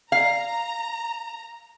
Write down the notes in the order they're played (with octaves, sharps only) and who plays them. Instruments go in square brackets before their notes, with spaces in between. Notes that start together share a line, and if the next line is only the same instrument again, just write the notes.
[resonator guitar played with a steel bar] F5 [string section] A#5